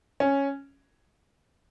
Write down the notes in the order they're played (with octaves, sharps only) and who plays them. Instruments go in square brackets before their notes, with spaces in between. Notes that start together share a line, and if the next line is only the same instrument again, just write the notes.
[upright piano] C#4